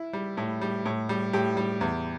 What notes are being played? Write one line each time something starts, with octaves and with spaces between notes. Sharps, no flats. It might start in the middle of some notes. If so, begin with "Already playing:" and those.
Already playing: E4
G3
A2
G3
A2
G3
A2 G4
G3
E2